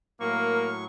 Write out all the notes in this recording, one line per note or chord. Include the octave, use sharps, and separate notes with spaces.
A2 F#3 A#3 A#4 F5 C#6 F6